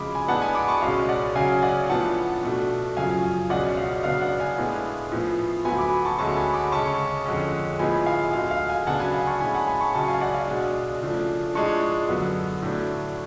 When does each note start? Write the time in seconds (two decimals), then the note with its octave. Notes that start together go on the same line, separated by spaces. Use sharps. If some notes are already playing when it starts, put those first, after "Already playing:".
Already playing: F2 C#3 G#3 B5 D6
0.15 G#5 B5
0.28 A2 G#3 B3 D4 F#5 A5
0.42 G#5 B5
0.55 B5 D6
0.68 A5 C#6
0.82 C#2 B2 G#3 C#4 F5
1.09 D5 F#5
1.35 C#3 F#3 C#4 F5 G#5
1.62 D5 F#5
1.89 A2 F3 B3 D4 F#5 A5
2.43 B2 A3 D4
2.97 F#2 C#3 F3 F5 G#5
3.50 C#2 B2 G#3 C#4 D5 F#5
3.77 F5
4.04 C#3 F#3 B3 D4 F5
4.21 D5 F#5
4.40 F5 G#5
4.58 A2 G#3 B3 D4
5.12 A2 F3 B3
5.65 D2 D3 F#3 B3 G#5 B5
5.78 B5 D6
6.05 A5 C#6
6.19 D2 D3 G#3 C#4 A5 C#6
6.36 G#5 B5
6.54 B5 D6
6.72 C#3 G#3 C#4 A5 C#6
7.26 F2 D3 G#3 C#4
7.79 A2 F3 G#3 B3 G#5 B5
8.06 F5 G#5
8.33 D2 D3 G#3 F5
8.51 F5
8.69 F5 G#5
8.87 C#3 F#3 B3 D4 F#5 A5
9.00 G#5 B5
9.14 F5 G#5
9.27 A5 C#6
9.40 A2 G#3 C#4 G#5 B5
9.54 F#5 A5
9.67 G#5 B5
9.80 A5 C#6
9.94 C#2 C#3 F#3 C#4 A5 C#6
10.08 F5 G#5
10.21 D5 F#5
10.35 F5
10.47 B2 G#3 D4
11.01 C#3 F3 A3 D4
11.55 A2 F3 G#3 D4 A5 C#6
12.09 F#2 D3 F#3 B3
12.62 A2 F#3 A3 D4